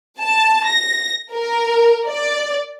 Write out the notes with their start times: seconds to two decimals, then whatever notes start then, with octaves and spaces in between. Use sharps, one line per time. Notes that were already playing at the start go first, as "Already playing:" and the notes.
0.19 A5
0.67 A#6
1.33 A#4
2.07 D5